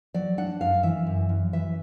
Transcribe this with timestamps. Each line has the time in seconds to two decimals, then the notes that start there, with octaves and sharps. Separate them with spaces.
0.14 F#3 D5
0.38 D4 F#5
0.61 F#2 F5
0.83 E3 E5
1.07 F#2
1.29 F#2
1.53 E3 E5